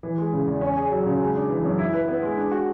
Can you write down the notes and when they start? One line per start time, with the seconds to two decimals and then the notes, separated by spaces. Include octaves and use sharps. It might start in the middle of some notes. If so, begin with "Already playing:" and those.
0.03 E3
0.18 G#3
0.33 C#3
0.47 E2
0.61 C#4
0.77 G#4
0.91 F#3
1.06 C#3
1.20 G#3
1.35 D4
1.49 E3
1.64 F#2
1.78 E4
1.94 B4
2.08 B3
2.23 G#3
2.37 D4
2.52 F#4